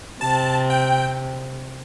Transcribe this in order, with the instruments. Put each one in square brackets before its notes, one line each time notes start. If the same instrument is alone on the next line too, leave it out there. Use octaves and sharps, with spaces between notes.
[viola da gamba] C3 [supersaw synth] A5
[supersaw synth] G5